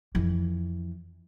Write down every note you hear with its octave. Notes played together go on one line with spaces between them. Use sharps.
F2 E3